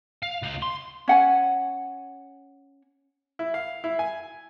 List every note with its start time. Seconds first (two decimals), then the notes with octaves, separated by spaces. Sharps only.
0.23 F5
0.42 C#2 F5
0.62 C6
1.08 C#4 F#5 G#5
3.39 E4
3.54 F5
3.84 E4
3.99 G#5